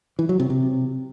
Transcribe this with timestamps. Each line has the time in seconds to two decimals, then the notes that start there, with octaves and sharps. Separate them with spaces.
0.19 E3
0.29 F#3
0.39 C3
0.50 C3